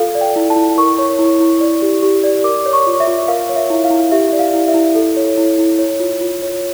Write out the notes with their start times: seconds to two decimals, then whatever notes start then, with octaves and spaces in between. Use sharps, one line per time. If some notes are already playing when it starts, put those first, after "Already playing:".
Already playing: F4 A4 F5
0.15 D5
0.21 G5
0.36 E4
0.50 A5
0.56 E4
0.78 A#4 C#6
0.99 C#5
1.19 E4
1.40 E4
1.61 D5
1.82 G4
2.03 G4
2.24 D5
2.44 A#4 D6
2.66 C#5
2.73 C#6
2.87 F4
3.00 E5
3.07 F4
3.28 A#4 F5
3.49 C#5
3.56 E5
3.70 E4
3.84 F5
3.90 E4
4.12 G4 E5
4.32 D5
4.39 F5
4.54 E4
4.68 E5
4.74 E4
4.95 A4
5.16 C#5
5.38 E4
5.58 E4
5.79 C#5
6.00 F4
6.21 F4
6.42 C#5